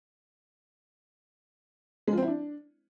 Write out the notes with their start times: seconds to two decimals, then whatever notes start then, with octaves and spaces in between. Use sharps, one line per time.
2.08 G#3
2.13 F3
2.18 C4
2.23 E4
2.28 D4